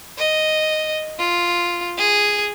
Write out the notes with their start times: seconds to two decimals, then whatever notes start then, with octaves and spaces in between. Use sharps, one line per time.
0.18 D#5
1.18 F4
1.98 G#4